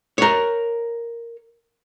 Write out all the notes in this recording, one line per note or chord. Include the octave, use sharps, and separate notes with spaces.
A#4 C#5